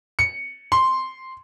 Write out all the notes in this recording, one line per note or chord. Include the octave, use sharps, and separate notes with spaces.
C#7
C6